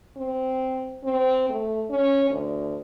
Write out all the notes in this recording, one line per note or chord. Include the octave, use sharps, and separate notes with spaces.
C4
C4
A3
C#4
D2